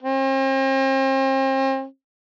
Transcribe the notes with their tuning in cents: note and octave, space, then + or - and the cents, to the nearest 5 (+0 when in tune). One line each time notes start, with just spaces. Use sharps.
C4 +40